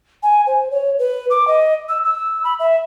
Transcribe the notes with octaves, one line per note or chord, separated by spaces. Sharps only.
G#5
C5
C#5
B4
D6
D#5
E6
E6
B5
E5